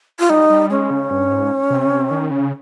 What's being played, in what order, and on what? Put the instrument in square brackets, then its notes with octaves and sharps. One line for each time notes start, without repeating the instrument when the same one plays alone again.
[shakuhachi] F4
[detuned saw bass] G3 [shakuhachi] D#4
[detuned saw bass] G3
[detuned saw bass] G#3 [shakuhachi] C#4
[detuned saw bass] C#3
G2
G#2
C3
C#3
C3
D#3
C#3